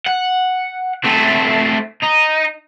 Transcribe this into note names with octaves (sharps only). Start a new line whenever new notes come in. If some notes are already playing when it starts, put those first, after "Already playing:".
F#5
A3 C4
D#4